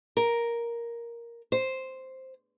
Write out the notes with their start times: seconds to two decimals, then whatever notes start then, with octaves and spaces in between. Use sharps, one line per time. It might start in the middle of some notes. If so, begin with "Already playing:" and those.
0.17 A#4
1.52 C5